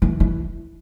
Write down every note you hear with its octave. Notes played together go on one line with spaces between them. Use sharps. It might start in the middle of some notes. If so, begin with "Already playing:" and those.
E3
E3